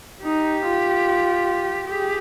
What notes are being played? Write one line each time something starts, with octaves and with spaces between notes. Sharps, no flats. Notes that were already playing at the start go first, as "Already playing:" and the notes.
D#4 G4
F4
G4 G#4